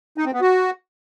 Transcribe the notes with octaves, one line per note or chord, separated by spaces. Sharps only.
D#4
C4
B3
F#4